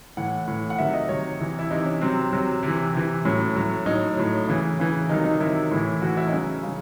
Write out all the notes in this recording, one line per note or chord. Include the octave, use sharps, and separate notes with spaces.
A2 E3 F#5
A2 E3
F#5
C3 D#3 F#3 E5
D#5
C3 D#3 F#3 C#5
C3 E3
E4
C3 E3 D#4
C#4
C3 F#3 C4
C3 F#3
C3
E3
C3 E3
A2 F#3 C#4
A2 F#3
A2 F#3 D#4
A2 F#3
C#3 E3
C#3 E3
C3 D#3 F#3 D#4
D#4
C3 D#3 F#3 E4
A2 E3
A2 E3 F#4
E4
D#4
C#3 F#3 C#4
C#3 F#3